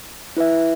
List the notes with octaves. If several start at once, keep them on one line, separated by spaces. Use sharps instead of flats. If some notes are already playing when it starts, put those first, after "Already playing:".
E4 B4 E5